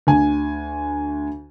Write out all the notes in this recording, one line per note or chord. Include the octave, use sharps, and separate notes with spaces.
D2 G#5